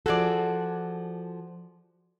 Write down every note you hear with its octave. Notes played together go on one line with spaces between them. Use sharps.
F3 F#4 G#4 A4 D5